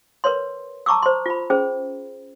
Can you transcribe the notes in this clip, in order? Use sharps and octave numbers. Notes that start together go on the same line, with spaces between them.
A#4 B4 C#5 C6
A5 A#5 C#6 D6 E6
C5 C6
F4 B5
C#4 G#4 C5